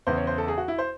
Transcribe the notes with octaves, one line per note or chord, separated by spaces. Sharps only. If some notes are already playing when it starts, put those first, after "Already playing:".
E2 C#3 E3 C5
C#5
C5
A4
G#4
F#4
E4
C5